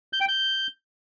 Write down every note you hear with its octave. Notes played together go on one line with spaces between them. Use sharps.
G6
G5
G6